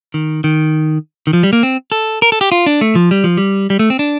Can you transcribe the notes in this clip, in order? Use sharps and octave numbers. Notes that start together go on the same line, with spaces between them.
D#3
D#3
D#3
F3
G3
A#3
C4
A4
A#4
A4
G4
F4
D4
A3
F3
G3
F3
G3
G3
A3
C4
D4